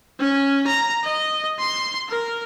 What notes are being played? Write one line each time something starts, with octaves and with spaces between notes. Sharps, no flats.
C#4
A#5
D#5
C6
A#4